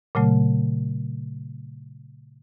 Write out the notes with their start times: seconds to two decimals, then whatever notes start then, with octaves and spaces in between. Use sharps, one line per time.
0.15 A#2 C#3 F#3 A3